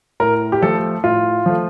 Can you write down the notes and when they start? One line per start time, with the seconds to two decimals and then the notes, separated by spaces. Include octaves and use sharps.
0.20 A2 A#4
0.52 G4
0.62 F3 A3 A4
1.04 A2 F4
1.46 F3 A3